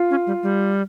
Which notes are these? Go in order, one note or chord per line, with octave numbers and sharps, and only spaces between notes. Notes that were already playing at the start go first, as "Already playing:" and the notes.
Already playing: F4
C#4
G3
G3